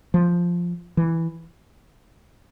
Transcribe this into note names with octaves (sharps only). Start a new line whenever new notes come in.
F3
E3